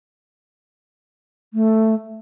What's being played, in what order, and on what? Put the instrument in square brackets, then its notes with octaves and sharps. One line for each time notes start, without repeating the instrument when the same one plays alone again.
[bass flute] A3